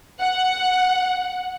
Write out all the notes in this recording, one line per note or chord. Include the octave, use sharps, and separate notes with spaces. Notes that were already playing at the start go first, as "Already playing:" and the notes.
F#5